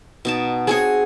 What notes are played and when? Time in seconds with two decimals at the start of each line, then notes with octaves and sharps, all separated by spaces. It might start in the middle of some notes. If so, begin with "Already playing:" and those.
0.25 B2 D#4 A5
0.67 C4 F#4 G#4 C#5